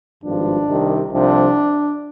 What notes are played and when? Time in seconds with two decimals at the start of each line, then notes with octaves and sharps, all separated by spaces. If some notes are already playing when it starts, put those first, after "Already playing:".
0.22 G#1 G2 F3 D4
0.67 C2 C3 D#3
1.11 C2 C3 F3 D4